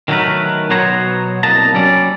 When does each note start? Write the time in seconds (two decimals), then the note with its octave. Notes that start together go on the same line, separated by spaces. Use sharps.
0.08 D#3 F#3 A3 B3 A#4 B4
0.70 B2 F#3 B3 C5 C#5 A#5
1.43 C2 A#3 D#5 A5 A#5
1.74 F#3 G3 C#4 D5